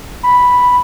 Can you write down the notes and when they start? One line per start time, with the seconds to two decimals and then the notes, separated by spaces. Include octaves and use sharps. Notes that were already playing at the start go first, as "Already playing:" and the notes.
0.23 B5